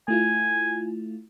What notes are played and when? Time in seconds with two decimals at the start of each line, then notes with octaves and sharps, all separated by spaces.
0.08 A3 E4 F4 G#5